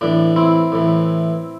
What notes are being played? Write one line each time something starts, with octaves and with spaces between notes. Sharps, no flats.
A2 E3 D4
C4 E4
A2 E3